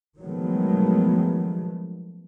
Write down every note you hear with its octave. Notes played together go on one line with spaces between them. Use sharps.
D#3 F3 F#3 G#3 A3 B3